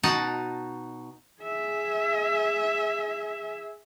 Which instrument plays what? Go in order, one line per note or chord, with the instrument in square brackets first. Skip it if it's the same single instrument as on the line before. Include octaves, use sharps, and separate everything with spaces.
[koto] B2 D#4 F#4 A5
[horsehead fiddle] G#4 E5